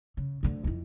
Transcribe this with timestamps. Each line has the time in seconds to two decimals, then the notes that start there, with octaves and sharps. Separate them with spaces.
0.17 C#3
0.43 D2 D3
0.64 F2 E4